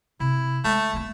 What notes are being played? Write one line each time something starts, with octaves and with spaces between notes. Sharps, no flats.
C3 E4
G#3 A3
A3 A#3